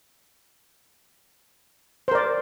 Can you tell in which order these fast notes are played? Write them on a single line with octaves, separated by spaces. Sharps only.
C5 A#4 D5